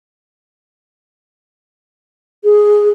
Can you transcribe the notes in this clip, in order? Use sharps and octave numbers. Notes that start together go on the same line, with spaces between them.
G#4